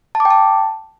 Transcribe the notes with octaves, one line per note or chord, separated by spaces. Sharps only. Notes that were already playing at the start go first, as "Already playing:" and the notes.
A5
D6
G5
A5